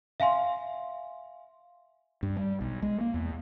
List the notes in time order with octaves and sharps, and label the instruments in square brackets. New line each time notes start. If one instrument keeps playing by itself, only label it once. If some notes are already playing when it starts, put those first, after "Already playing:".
[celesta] E5 F5 G#5 C6
[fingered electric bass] G2
G3
B1
G#3
A#3
E2